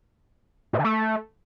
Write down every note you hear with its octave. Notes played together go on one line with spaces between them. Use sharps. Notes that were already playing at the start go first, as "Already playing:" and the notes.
A2
D3
A3